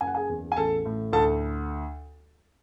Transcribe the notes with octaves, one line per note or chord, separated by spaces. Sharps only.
F#1 G#5
F#5
G#4 G#5
E2
G#5
A1 A4 A5
A2
D2 A4 A5